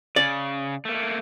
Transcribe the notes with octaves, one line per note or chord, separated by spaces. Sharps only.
C#3 D5
A3 A#3